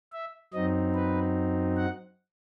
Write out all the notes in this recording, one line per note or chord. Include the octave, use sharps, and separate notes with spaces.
E5
F#2 F#3 C4 D#4 D#5
B4
F#5